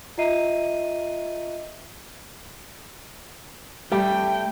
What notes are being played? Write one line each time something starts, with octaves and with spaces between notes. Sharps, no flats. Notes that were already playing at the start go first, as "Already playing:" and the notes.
F4 D#5 E5 A#5 C7 D#7
G3 A3 G5